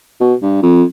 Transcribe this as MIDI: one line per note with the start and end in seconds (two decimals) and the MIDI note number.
0.21 0.34 47
0.42 0.61 43
0.62 0.83 41